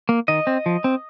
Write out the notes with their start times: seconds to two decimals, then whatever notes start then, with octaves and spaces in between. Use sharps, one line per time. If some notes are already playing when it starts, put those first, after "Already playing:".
0.09 A#3
0.28 D#3 D#5
0.47 C4
0.66 F3
0.84 C4